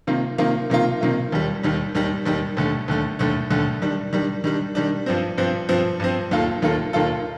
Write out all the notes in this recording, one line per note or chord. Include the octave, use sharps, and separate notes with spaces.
C3 D#3 A#3 F4
C3 D#3 A#3 F4
C3 D#3 A#3 F4
C3 D#3 A#3 F4
D#2 D#3 G3
D#2 D#3 G3
D#2 D#3 G3
D#2 D#3 G3
D#2 D3 A3
D#2 D3 A3
D#2 D3 A3
D#2 D3 A3
D#3 G3 D4
D#3 G3 D4
D#3 G3 D4
D#3 G3 D4
G2 F3 C4
G2 F3 C4
G2 F3 C4
G2 F3 C4
D#2 D#3 A#3 F4 A4
D#2 D#3 A#3 F4 A4
D#2 D#3 A#3 F4 A4